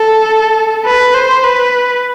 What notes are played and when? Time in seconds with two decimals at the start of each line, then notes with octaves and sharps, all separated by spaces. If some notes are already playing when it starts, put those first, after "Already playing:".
Already playing: A4
0.86 B4
1.15 C5
1.44 B4